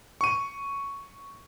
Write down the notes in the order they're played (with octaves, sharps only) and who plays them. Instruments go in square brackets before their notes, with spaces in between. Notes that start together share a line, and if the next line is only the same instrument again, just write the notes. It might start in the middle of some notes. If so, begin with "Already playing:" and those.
[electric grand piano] C#6 D#7